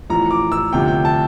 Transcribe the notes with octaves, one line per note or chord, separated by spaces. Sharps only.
A1 A2 F3 A#5
D6
E6
D2 C3 F3 G5
G5
A5